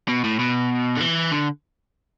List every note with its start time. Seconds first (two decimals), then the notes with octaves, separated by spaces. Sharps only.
0.08 B2
0.24 A2
0.39 B2
0.97 D3
1.00 E3
1.32 D3